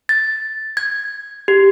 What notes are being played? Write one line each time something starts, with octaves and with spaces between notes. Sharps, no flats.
A6
G#6
G4